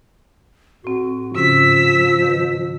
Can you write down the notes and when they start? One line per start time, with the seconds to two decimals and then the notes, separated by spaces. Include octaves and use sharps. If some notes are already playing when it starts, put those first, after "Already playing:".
0.84 A2 C4 F#4
1.35 G#2 C#3 F3 C#4 E6 B6
2.22 D#3 B4